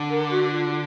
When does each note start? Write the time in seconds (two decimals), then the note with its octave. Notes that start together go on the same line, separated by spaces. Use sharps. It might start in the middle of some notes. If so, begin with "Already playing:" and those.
Already playing: D3
0.10 A#4
0.31 F#4
0.51 F4
0.71 F4